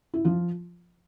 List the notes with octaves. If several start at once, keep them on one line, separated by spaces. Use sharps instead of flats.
E4
F3 F4